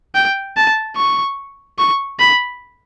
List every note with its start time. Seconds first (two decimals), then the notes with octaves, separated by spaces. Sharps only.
0.15 G5
0.57 A5
0.97 C#6
1.78 C#6
2.19 B5